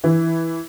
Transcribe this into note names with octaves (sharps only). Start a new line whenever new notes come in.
E3